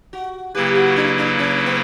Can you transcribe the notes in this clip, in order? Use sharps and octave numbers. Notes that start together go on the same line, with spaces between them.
F#4
C#3 F#3 A#3 E4 G4 B4
F#4
D4
D4
C#4
B3